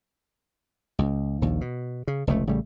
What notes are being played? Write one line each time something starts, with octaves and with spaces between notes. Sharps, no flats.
C#2
A#1 D#2
B2
C#3
F1 C#2 A3
A1 C#3 G3 A3